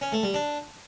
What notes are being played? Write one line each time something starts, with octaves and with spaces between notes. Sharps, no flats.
C#4
A3
G3
D4